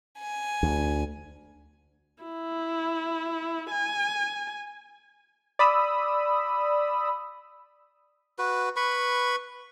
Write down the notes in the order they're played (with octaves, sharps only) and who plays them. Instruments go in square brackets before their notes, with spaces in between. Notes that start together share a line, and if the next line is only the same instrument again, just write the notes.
[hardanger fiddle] G#5
[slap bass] D2
[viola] E4
G#5
[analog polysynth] D5 B5 D#6 E6
[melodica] F#4 B4
B4 B5 C#6